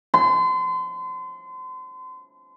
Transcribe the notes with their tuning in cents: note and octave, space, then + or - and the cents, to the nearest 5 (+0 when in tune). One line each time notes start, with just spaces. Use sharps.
C6 -35